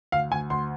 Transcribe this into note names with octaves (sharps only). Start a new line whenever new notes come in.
D2 F5
D2 G#5
D2 C6